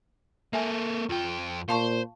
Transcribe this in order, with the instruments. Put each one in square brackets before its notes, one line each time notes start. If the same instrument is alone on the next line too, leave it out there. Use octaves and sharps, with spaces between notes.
[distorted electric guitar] A#3 A4 [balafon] E5 G#5
[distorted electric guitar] F2 G5 [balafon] F4
[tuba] A#2 [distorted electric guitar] C5 [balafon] F5 A5 C#6